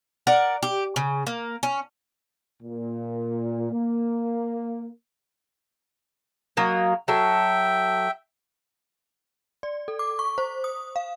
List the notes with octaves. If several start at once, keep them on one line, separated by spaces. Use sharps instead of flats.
A#4 D5 F#5
G4
C#3
A#3
C#4
A#2
A#3
F#3 A#3 D#5
F#3 A4 E5 G5
D5
A4
D6
C#6
C5
D#6
F5